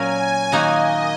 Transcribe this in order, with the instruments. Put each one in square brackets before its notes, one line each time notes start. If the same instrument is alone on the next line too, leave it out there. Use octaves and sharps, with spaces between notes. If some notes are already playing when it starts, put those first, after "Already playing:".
Already playing: [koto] A#2 F#3 C#4 A#4 [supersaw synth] G#5
[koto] D#3 A#3 D#4 F#4 [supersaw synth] D#5